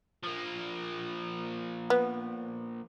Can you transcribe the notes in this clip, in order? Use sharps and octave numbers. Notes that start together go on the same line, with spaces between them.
F3 A#3
B3